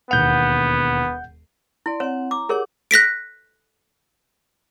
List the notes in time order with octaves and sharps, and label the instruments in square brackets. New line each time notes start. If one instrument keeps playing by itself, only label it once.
[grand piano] E1 D#2 F7 [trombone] B3 [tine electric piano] F#5 G6
[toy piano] E4 [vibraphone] D5 C6
[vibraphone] C4 F#5 [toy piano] C#5
[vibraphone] A#5 [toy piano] D6
[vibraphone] G4 F#5 D6 [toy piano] G#4 A#4 C#5
[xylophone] F#6 A#6 B6 D7